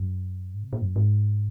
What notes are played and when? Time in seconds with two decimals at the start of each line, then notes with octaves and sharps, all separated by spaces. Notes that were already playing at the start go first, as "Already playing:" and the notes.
Already playing: F#2
0.54 G#2
0.63 C3
0.73 A#2
0.82 F#2
0.96 G#2